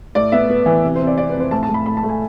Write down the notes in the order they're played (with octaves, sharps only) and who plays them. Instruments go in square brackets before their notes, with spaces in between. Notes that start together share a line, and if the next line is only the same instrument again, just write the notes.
[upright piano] A2 D5
B3 E5
B3
E3
C3
C5
C3
D5
C3 D5
B4
F2
C5
A2 A5
A5
A2 B5
A2 B5
A5
A3
G#5